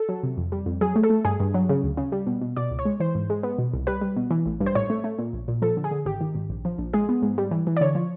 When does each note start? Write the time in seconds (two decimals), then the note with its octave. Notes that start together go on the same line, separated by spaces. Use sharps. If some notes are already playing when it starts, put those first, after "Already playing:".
Already playing: A4
0.09 F#3
0.23 C3
0.37 F2
0.52 G3
0.66 F2
0.81 F#3 G#4
0.96 A3
1.03 A4
1.10 A3
1.25 G2 G#4
1.40 G2
1.54 F#3
1.69 C#3
1.84 D2
1.97 C#3
2.12 G3
2.26 B2
2.41 B2
2.56 B2 D5
2.71 C#2
2.79 C#5
2.85 G#3
3.00 E3 C5
3.15 G#2
3.30 G#3
3.43 B3
3.58 B2
3.73 C2
3.87 G3 B4
4.01 G3
4.16 B2
4.31 E3
4.46 A1
4.60 G2
4.66 C5
4.75 A2 C#5
4.90 A3
5.04 A3
5.19 A#2
5.33 A#1
5.48 A#2
5.62 F3 A4
5.77 D3
5.84 G#4
5.91 D3
6.06 G#1 G4
6.21 D#3
6.35 G#1
6.49 A#1
6.65 F3
6.78 A#1
6.93 G#3 G#4
7.09 B3
7.22 G#2
7.38 G3
7.51 E3
7.67 E3
7.77 D5
7.81 D3 C#5
7.95 F3